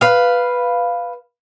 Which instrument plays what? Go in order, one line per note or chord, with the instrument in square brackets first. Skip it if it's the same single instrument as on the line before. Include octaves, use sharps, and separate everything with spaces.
[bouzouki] B4 F5